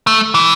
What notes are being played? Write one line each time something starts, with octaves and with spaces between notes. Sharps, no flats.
A3
E3